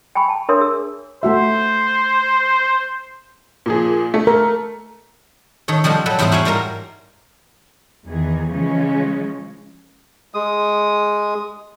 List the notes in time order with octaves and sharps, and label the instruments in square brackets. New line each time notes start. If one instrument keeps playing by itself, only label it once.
[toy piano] G5 G#5 B5 C#6
A5
D4 A#4 C#5 E5 C6 D#6
G#4 E6
[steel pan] A3 F#4 E5 [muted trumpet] C5
[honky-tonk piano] A#2 F3 G#4
A3
[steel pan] A#4
[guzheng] D#3 A4 C#5
F3 G3 G#3 F#4 A4
F#3 G3 A4 B4
E2 G#2 G3 E4 G#4 C5
E4 F#4 G4 C#5 F5 G#5
G#2 G3 F4 A#4 A#5
[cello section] E2 D#3 E3 G#4
C#3 E3 F3 G#3 C#4
[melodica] G#3 D#6